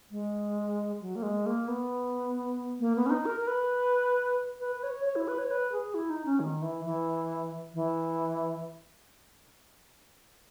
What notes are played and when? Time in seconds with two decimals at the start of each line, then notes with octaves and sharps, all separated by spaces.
0.11 G#3
1.01 F#3
1.16 A#3
1.23 G#3
1.46 A#3
1.68 B3
2.80 A#3
2.96 B3
3.06 C#4
3.10 D#4
3.26 A#4
3.41 A#4
3.47 B4
4.60 B4
4.76 B4
4.83 C#5
5.05 C#5
5.16 E4
5.28 B4
5.39 C#5
5.51 B4
5.72 G#4
5.94 E4
6.10 D#4
6.26 C#4
6.40 D#3
6.62 E3
6.85 E3
7.74 E3